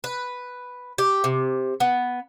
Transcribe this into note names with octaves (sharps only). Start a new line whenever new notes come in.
B4
G4
C3
B3